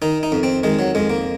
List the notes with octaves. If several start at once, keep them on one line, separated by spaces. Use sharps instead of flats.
D#3 D#4
D#4
F2
C4
D#3 G#3
F#3
F2 G#3
A#3